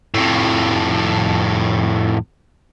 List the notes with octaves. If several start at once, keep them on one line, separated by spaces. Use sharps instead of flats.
F2 A2